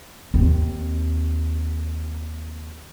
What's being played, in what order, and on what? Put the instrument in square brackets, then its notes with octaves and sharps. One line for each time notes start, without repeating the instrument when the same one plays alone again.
[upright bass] D#2 C4